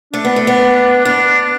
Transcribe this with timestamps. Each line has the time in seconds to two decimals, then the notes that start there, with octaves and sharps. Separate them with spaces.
0.13 A3 D4
0.25 B3
0.36 A3
0.47 B3
1.05 B3 D4